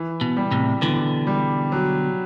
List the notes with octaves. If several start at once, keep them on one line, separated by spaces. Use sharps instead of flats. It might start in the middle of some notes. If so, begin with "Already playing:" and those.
Already playing: E3
B2
G3
A2 C3
B2 D3 E3
G3
F#3